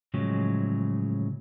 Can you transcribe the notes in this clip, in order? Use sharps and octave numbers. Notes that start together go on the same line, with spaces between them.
A2 C#3 F3 F#3 G#3